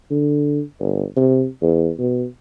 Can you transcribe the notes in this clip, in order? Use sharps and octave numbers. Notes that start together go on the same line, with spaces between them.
D3
G1
C3
E2
B2